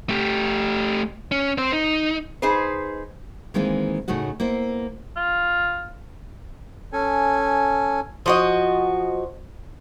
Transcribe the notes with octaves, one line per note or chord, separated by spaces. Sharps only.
A3 G4
C#4
C4 C5
D#4
D#4 G#4 B4 C5
D#3 E3 G#3 A#3 C4 E4
A2 C#3 A3 D#4 F#4
A#3 B3 E4 C5
F4
C#4 A4 G#5
F3 F#4 D#5